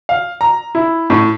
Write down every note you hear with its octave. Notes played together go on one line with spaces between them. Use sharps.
F5
A#5
E4
A2